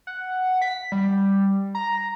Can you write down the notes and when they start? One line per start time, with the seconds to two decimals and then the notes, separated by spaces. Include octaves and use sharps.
0.07 F#5
0.62 B6
0.92 G3
1.75 A#5